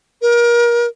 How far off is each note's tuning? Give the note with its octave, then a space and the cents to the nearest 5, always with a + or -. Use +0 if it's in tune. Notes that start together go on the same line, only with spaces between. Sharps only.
A#4 +30